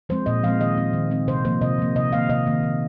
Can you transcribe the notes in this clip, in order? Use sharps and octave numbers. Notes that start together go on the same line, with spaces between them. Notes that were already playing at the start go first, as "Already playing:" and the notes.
F3 G#3 C4 C5
A#2 D#5
F3 G#3 C4 F5
D#3 D#5
G#3 C4
D#3
G#3 C4
C3 C5
F3 A#3 C5
C3 D#5
F3 A#3
C3 D#5
D#3 A#3 F5
C3 D#5
D#3 A#3
D#3